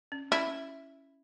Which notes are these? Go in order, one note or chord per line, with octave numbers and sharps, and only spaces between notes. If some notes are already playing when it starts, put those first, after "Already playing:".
C#4
C#4 E4